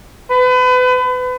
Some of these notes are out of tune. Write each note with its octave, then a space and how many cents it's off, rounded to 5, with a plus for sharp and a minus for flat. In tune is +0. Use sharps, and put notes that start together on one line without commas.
B4 +35